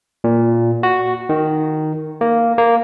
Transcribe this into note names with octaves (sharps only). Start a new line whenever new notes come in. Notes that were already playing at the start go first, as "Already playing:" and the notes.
A#2
F#4
D#3
A#3
A#3